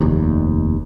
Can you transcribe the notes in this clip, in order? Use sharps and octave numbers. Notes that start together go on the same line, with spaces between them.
F1 D#2